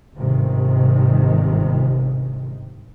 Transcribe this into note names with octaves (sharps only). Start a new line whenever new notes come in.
G1 G#2 C3 D#3